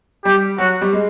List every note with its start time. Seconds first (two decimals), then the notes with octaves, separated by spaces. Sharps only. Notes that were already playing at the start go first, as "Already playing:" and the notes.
0.25 G3 G4
0.58 F#3 F#4
0.81 G3
0.93 G#3